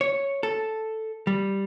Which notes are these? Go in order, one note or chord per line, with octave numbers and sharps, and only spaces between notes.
C#5
A4
G3